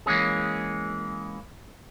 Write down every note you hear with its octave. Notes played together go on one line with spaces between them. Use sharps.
E3 G#3 A#3 C#4 G#4